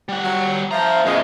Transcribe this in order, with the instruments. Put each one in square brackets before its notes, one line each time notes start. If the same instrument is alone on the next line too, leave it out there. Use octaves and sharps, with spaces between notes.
[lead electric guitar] G3 F#5
[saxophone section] F#3
[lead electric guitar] D3 A#5 [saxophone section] F3 [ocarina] E5
[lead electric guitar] F#2 B2 [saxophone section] F3 G#3